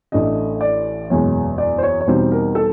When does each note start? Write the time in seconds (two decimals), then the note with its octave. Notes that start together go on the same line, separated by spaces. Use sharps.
0.12 A1 A2 E3 A3 D4 D#5
0.61 D5
1.10 F#1 E2 B2 G#3 C#5
1.58 D5
1.78 C5
1.83 C#5
2.01 C#5
2.07 E2 B2 G3 C4 D#4 C5
2.32 A#4
2.55 A4